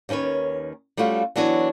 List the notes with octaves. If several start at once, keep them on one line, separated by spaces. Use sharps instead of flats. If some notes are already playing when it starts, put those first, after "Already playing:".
D#2 D#3 C#4 B4 C#5
G3 A3 C#4 F4 F#4
E3 F#3 B3 D4 F#4 C#5